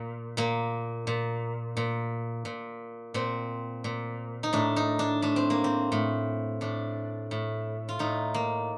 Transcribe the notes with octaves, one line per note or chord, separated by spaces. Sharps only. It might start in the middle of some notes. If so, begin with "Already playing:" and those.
Already playing: A#2
A#2 A#3
A#2
A#2
A#2
A#2 C4
A#2
D#4
A2 D4
D#4
D4
A2 D4
C4
A#3
C4
A2
A2 D4
A2
F4
A2 D#4
A#3